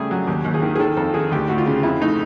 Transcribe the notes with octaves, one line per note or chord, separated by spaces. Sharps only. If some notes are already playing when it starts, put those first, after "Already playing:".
Already playing: C#3 G3 A3 G#4
F#3
D#2 G4
D#2
G#4
D#3
G#4
D#3 A4
F2 A4
D#3 G#4
D2 G4
D2 F#4
F4
C#3
F2 E4
A3 D#4